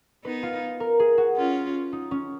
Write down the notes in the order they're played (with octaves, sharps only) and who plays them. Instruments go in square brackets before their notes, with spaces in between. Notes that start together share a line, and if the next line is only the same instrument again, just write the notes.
[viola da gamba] B3 D#4 [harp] B4
[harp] F4
A#4
G#4
F#4
[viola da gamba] C#4 F4
[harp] D#4
C#4